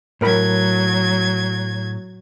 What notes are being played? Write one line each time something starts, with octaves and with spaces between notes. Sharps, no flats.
A2 F#3 A#4 B5 G#6